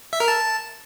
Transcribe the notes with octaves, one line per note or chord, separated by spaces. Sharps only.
E5
A#4
A5